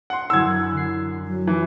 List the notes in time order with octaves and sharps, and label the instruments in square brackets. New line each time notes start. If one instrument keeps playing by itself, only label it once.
[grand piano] F#5 C6
[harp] F#2 D3 G#5 [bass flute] E4 [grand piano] E6 G#6
[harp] D3 C7
[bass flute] F#3
[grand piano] E3